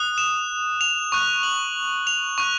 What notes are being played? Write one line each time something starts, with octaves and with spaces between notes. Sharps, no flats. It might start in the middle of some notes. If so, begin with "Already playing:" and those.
Already playing: D#6 F#6
E7
F7
C#6 F#6
F#7
F7
C#6 F#6